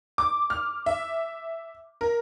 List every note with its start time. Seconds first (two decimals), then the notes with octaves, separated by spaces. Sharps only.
0.18 D6
0.50 F6
0.86 E5
2.01 A#4